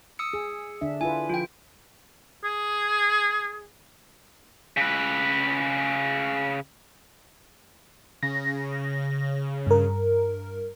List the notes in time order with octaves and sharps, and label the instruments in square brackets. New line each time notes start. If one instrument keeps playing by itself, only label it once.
[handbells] D#6 E6 C#7
[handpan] G#4
D3 D4 E5
[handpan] E4 F4 B4 [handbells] G#5
[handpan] F3 [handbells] F4 G5
[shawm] G#4
[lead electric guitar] C#3 B4
[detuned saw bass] C#3 [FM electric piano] A#6
[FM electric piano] G2 A#4